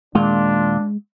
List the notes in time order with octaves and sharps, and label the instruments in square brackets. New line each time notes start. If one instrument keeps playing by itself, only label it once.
[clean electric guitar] D#2 A#2 F4 [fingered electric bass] G#3 [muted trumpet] D4